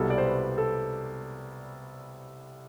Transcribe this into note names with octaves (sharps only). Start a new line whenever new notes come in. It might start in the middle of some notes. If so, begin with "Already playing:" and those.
Already playing: C2 B2 G3 A4
D5
C5
B4
A4